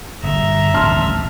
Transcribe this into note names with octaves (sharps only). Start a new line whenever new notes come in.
G1 G2 A#2 E5 A#5
D#1 A1 A5 C6 F6